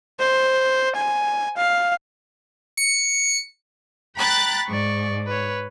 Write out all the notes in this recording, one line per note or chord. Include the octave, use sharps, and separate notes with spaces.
C5
G#5
F5
C#7
G5 A#5 B5 F#6 A6
G#2 D5 C#6
B4 C#5